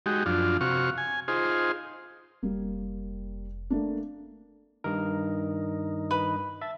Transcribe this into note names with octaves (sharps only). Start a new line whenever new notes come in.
G#3 D#4 F#4 G4
F#2 F3 D4 F4
C3 F#4 F5 C#6
G#5
D#4 F4 G#4 C5
F1 G3 A#3
A3 A#3 D4
G2 D#3 D#4 A#4
B4 B5
E5 A5